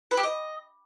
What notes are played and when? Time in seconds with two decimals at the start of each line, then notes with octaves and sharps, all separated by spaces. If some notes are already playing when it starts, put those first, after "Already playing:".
0.11 B4
0.17 G4
0.23 D#5